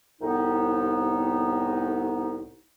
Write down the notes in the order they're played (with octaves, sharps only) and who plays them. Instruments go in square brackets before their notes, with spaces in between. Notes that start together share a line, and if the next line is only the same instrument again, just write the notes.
[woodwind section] C2 A2 B3 D#4